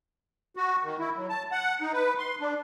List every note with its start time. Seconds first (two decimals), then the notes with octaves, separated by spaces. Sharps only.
0.56 F#4
0.84 D#3
0.99 E4
1.16 F#3
1.29 A5
1.52 F#5
1.81 D#4
1.93 B4
2.18 C6
2.40 D4